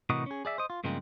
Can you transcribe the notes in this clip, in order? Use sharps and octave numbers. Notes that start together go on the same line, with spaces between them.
A2 C3 E3 F#4 A#4 D#5
C#4 G#4
G#4 D5 E5
C5 D#5
F4
G2 C#3 F3 G#3 A#3 C4